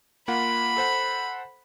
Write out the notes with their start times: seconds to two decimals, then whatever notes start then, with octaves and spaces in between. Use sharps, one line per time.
0.28 A#3 F4 F#5 B5
0.77 A4 C5 F#5